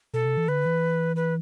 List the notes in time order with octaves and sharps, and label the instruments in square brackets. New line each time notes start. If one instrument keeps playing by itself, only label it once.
[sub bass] B2 [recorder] A4
[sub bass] C3
E3
[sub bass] D3 [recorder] B4
[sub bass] E3
[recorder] B4